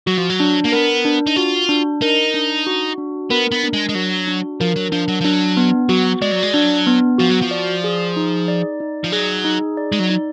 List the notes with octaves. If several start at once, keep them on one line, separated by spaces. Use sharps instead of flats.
F#3 F#4
F3
F#3
D4
A#3
B3 A#4
D4
D#4
F4 F#4
D4
D#4 A#4
D4
F#4
D4
B3 A#4
B3
D4
G#3
G#3
F#3 F#4
D4
F3 A#4
F#3
F3 D4
F#3
F3
F#3 D4
B3
F#3 F#4
G#3 D5
F#3
G#3
F#3 D4
B3
F3 F#4
F#3
F3
D5
G#4
D#4
D5
D#4
F3
F#3 G#4
D#4
D5
G#3
F#3
D#4